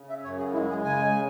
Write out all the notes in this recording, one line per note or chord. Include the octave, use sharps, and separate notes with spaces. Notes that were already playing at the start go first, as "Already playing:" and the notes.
Already playing: C#3
E5
F#2 C#5
G#4
G#3 E4
G#4
C#3 G#5